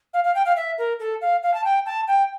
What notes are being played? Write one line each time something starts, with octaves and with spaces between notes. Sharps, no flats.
F5
F5
G5
F5
E5
A#4
A4
F5
F5
A5
G5
A5
G5